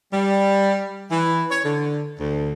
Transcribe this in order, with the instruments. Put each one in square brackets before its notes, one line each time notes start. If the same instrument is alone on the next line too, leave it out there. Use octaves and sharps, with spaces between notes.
[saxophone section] G3
E3
C#5
D3
D2